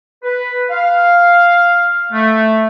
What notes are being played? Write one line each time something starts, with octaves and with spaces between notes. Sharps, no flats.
B4
F5
A3